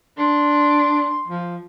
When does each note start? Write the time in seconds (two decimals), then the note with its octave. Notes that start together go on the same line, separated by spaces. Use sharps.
0.18 D4 C6
1.28 F3